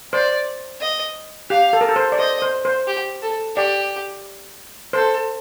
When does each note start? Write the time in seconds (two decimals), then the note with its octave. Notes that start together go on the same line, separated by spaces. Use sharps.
0.13 C5 D5
0.81 D#5
1.50 G4 F5
1.73 A4
1.81 A#4
1.89 A4
1.96 C5
2.12 D5
2.19 C5 D#5
2.42 C5
2.65 C5
2.88 G4
3.22 A4
3.56 G4 D5
4.93 A4 C5